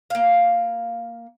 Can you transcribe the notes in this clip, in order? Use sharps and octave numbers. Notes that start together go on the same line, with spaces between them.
A#3 F5